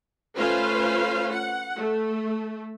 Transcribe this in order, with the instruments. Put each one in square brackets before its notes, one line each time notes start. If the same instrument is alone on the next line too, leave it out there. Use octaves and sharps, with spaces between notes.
[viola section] A3 C#4 F4 B4 C5 F5
F#5
A3